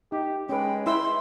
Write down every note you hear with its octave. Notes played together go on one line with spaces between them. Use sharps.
D#4 G4
G#3 C#4 B4 G5
E4 B4 C6 E6